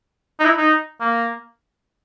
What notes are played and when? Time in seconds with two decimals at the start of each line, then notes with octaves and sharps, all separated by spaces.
0.40 D#4
0.45 E4
0.58 D#4
1.01 A#3